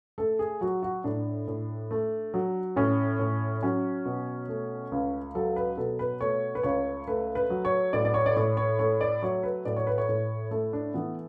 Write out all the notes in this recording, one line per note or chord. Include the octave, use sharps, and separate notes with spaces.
A3 A4
G#4
F#3 F#4
F#4
A2 D4
A2
A3
F#3
A2 C#4
A2
F#3 C#4
B2
A3
C#2
F#3 A4
B4
B2 A4
B4
A3 C#5
B4
C#2 C#5
A3 B4
B4
F#3
C#5
A2 D5
D5
C#5
D5
A2 C#5
C#5
A3 C#5
D5
F#3 C#5
B4
A2 D5
C#5
B4
C#5
A2
A3
D4
E3 B3